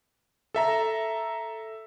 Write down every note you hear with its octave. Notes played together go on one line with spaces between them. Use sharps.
A4 E5 A#5